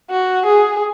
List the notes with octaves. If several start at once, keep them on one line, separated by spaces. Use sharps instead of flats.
F#4
G#4